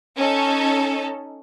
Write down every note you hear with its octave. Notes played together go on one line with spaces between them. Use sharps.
C#4 D#4 A4